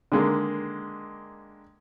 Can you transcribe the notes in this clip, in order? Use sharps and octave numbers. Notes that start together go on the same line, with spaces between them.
D3 D#3 G#3 A#3